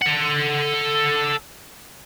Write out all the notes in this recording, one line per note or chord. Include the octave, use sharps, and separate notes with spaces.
A4 F#5